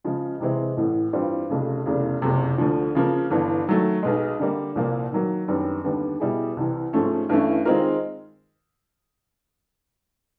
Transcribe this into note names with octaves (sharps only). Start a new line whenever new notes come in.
C#3 F3 G#3
C3 E3 G#3 C4 E4
A1 A2 E3
G2 E3 G3 C4 F4
F1 F2 C#3
F1 E2 C#3
F#1 F2 C3
D2 D3 F3
C#3 F3 A#3
G1 G2 E3
D#3 F#3 A3
B1 B2 G#3
D3 G3 A#3
C2 A#2 F3 A#3
D#3 F#3 A#3
F#2 D#3 G3 B3 D4
D#2 D3 G3 B3 D4
B2 G3 B3 E4 G#4
C2 C3 E3
G#2 F3 A3 C#4
G2 E3 A3 C#4 E4
D#3 G#3 C4 F4 A#4